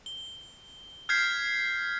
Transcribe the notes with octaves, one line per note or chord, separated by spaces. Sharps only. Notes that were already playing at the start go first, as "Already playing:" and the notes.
G7
F6 G6 G#6 B6 C7